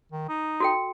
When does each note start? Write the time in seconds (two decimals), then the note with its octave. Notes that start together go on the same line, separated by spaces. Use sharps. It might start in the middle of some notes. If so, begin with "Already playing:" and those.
0.12 D#3
0.29 D#4
0.60 F#4 A4 G5